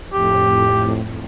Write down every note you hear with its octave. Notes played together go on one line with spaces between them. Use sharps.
F2 A2 G4